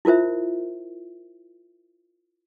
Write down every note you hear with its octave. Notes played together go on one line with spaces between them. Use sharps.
E4 F4 A#4 C5 E5